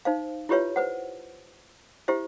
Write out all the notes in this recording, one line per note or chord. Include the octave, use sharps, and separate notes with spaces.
D#4 C5 F5
E4 F4 G4 B4 C#5 E5
B4 C5 F#5
E4 G4 C5 E5